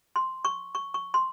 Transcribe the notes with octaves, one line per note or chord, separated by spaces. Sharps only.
C6
C#6
C#6
C#6
C6